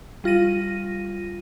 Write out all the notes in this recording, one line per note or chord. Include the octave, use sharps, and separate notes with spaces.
G3 F4 A#6 D#7